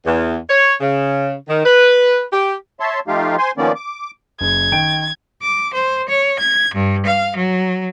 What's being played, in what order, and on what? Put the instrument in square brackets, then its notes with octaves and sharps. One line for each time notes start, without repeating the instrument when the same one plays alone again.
[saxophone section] E2
C#5
C#3
D#3
B4
G4
[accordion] C#5 E5 A5 C6
F3 A3 D#4 F4 G4 F5
C5 G#5 C6
D#3 F3 A#3 B3 C#4 D5
D6
[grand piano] F#1 [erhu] G#6
[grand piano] D#3 G5 D7
[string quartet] D6
C5
C#5
G#6
G2
F5
F#3